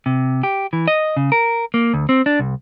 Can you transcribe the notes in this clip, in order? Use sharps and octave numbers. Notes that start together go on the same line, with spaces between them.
C3
G4
E3
D#5
C#3
A#4
A#3
D2
C4
D4
C2